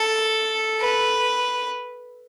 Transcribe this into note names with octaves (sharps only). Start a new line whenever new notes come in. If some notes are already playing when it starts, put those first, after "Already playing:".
Already playing: A4
B4